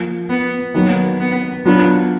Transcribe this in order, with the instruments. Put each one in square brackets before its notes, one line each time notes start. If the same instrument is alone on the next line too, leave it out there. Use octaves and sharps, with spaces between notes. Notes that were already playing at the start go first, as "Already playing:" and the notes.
Already playing: [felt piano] F3 A#3 F4
[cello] B3
[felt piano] D#3 F#3 A#3 [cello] B3
[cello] B3
[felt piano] F#3 D4 F4 [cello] B3